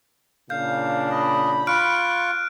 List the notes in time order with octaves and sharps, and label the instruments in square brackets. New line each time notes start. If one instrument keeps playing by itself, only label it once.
[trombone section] A#2 C#3 D4 [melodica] F5 [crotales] G6
[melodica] D#5 [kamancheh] B5
[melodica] F4 C#6 [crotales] F6 F#6 D7